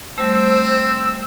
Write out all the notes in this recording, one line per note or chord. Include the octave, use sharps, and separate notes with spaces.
G3 A3 C4 C5 E6